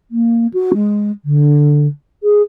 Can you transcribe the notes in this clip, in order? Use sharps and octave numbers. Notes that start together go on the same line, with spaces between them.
A#3
F#4
G#3
D3
G#4